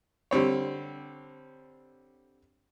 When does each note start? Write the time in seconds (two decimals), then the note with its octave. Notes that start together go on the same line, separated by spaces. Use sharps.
0.31 D3 G3 C4 C#5